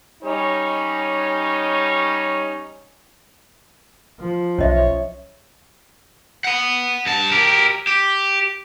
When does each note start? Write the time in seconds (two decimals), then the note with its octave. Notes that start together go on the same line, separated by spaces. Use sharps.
0.23 G3 C#4 D#4 C#5
4.19 F3
4.58 B1 C#4 C#5 D#5 E5
6.44 F#5 B5
7.06 G2 A5
7.32 G4 A#4
7.87 G4